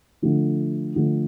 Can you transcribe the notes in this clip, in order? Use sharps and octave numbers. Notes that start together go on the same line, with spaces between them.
D3 F3 A3
D3 F3 A3